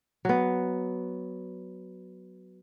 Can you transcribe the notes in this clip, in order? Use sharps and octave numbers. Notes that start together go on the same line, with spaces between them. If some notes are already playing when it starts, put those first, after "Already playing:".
F#3 B3